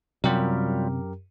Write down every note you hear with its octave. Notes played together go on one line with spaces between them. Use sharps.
F#2 C3 F#3 G3 F4 G4 A#4